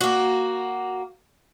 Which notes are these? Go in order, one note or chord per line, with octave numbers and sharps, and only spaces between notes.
A#3 F#4